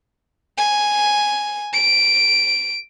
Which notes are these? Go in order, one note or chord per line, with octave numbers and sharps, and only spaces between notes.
G#5
D7